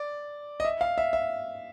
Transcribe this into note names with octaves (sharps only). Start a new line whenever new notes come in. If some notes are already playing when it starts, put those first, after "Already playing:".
Already playing: D5
D#5
E5
F5
E5
E5